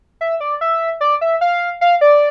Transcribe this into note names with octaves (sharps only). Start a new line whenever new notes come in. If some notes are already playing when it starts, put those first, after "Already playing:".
E5
D5
E5
D5
E5
F5
F5
D5